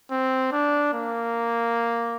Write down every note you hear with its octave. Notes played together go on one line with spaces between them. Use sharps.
C4
D4
A#3